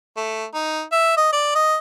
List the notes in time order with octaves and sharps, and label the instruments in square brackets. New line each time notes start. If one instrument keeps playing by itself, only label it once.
[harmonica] A3
D#4
E5
D#5
D5
D#5